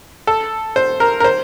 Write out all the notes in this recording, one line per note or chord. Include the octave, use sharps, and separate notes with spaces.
A4
C5
A#4
A#4
C5